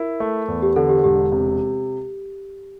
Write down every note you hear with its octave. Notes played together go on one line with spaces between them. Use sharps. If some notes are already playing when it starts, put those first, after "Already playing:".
Already playing: E4 A#4
A3
E2
G4
D3 A4
G4
E1 G4
C3